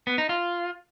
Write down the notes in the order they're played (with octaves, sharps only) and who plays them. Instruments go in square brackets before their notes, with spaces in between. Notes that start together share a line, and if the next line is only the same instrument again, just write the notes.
[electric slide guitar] B3
D#4
F4